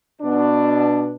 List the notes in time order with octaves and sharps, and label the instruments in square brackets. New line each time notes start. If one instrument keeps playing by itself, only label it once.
[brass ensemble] B2 D4